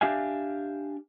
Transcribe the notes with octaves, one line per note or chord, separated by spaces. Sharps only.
D4 G4 E5 F5 G#5